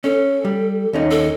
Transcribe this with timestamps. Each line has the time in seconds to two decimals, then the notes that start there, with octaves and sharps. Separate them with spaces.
0.04 C#4 A4
0.45 G3
0.93 D#2 C#4 D#4
1.11 A4